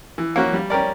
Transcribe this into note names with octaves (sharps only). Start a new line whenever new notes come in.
E3
A#3 C#4 F#4
G3
C#4 G4 A#4 D5